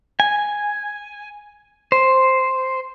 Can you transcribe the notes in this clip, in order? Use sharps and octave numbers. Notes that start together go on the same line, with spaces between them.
G#5
C5